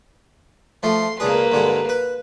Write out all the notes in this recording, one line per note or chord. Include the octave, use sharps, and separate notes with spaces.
F3 A3 C6
C#2 A#3 D4 G#4 B4
G2 D3 G#3
B4